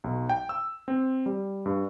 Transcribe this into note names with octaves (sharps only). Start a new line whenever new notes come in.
B1
G5
E6
C4
G3
G2